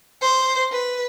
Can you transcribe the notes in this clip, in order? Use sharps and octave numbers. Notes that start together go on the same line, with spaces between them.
C5
B4